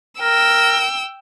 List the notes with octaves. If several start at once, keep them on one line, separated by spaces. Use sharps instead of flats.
A#4 G5 E6